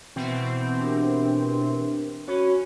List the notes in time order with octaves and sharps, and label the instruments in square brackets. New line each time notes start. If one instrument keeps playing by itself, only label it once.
[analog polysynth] B2 E3 C4
[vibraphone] D4 G4 A#4
[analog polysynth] C#4 [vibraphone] F#4 C#5 B5